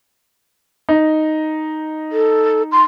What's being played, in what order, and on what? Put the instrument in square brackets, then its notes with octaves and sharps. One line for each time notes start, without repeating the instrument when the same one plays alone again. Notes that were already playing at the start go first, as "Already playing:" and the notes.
[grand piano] D#4
[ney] A4
C6